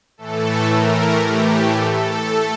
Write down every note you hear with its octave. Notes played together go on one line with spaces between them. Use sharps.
A2 E3 A3 A4
A#4
G4
A4
A3